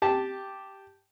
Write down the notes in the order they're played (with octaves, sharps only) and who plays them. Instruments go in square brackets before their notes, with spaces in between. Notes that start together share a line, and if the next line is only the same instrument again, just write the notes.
[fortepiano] G4 A5